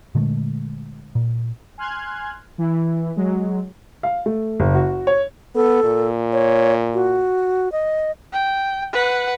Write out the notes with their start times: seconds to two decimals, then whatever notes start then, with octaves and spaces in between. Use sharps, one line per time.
0.15 A#2 D3 G#3 A3
1.15 A#2
1.78 G#5 C6 F6 F#6 G#6
2.58 E3 E4
3.16 F#3 G#3
4.03 F5
4.26 A3
4.60 F#1
4.75 F#4
5.07 C#5
5.55 B3 A4
5.84 A#2
6.33 C#5
6.94 F#4
7.72 D#5
8.33 G5
8.93 B4 F#5